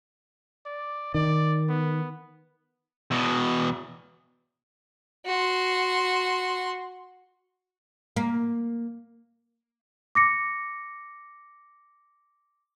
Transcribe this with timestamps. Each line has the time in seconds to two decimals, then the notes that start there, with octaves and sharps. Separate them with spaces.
0.66 D5
1.14 D#3 D5
1.69 B3
3.11 E2 B2
5.26 F#4 C6
8.16 A#3
10.15 D6 A#6 C#7